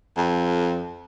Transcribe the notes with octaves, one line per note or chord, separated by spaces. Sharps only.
F2